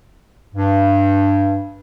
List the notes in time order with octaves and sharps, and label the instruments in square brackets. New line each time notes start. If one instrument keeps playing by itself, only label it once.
[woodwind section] G2